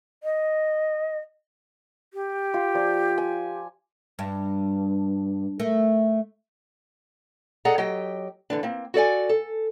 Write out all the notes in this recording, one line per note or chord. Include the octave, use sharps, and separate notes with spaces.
D#5
G4
F4
F3 D5
G#5
G2
A3 A#4
G#4 A4 D5 D#5 F#5 A#5
F#3 G4 D#5 G5
D3 E3 D4
A#3 C4
F#4 A4 D5 G#5
A4